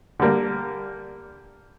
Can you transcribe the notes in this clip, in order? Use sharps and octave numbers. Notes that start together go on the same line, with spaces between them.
D3 G3 A#3